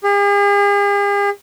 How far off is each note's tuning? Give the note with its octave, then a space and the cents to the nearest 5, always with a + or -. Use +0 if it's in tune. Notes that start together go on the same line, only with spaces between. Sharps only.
G#4 -45